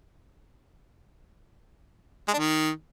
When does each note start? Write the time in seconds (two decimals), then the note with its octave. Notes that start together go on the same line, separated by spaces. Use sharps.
2.28 G#3
2.33 D4
2.39 D#3